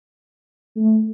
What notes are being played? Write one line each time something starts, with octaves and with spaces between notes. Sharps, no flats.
A3